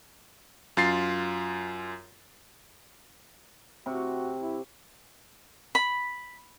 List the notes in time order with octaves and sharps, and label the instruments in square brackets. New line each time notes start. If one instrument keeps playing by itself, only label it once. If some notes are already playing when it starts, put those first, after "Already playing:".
[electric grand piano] F#2 F4 A6 C7
[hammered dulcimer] C3 C#6 [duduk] F#4
[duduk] E4
[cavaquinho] B5